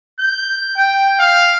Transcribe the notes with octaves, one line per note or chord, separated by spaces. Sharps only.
G6
G5
F5